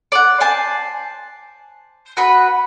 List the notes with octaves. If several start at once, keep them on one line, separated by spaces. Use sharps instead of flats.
D5 F#5
C5 G#5 A5
F#4 B4 B5